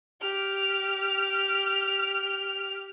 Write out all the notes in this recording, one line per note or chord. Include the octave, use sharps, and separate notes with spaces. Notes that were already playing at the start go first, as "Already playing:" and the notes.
G4 F6